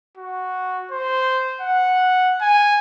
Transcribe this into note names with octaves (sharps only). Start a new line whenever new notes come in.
F#4
C5
F#5
G#5